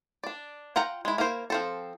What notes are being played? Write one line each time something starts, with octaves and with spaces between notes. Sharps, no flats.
D4 D5
F4 F#5 G5 A#5
G#3 E4
A#3 E4 A#4 C5
F3 C4 A4